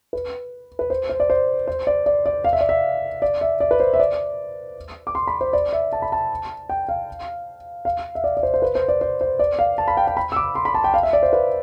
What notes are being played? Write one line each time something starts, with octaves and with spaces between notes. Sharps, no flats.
B4
B4
C5
C5
D5
C5
C5
D5
D5
D5
F5
E5
D5
E5
D5
E5
D5
B4
C5
E5
D5
D6
C6
B5
C5
D5
E5
A5
B5
A5
G5
F5
F5
E5
D5
D5
C5
C5
B4
C5
D5
C5
C5
D5
F5
A5
B5
G5
G5
B5
E6
D6
C6
B5
A5
G5
F5
E5
D5
C5
B4